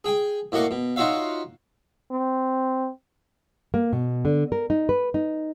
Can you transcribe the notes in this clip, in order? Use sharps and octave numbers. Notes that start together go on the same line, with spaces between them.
G#4 G5 G#5
A2 A#3 F#4 D#5 C#6 D6
B2
D#4 F4 F#4 C#5 E5 F5
C4
A#3
B2
D3
A#4
D#4
B4
D#4